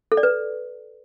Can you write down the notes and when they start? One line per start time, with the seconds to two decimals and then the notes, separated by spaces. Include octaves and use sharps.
0.12 A4
0.17 D5
0.23 B4